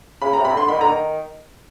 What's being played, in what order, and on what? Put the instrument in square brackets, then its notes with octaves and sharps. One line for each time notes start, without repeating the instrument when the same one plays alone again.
[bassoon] C#3 [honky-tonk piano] B5
[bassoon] C3 [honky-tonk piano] A#5
[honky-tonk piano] B5
[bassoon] D3 [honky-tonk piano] C6
[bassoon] D#3 [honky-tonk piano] B5
[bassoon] D3 [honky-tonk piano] A#5
[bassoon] D#3